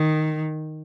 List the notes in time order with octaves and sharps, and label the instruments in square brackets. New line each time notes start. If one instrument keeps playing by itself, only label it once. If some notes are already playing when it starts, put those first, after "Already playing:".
Already playing: [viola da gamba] D#3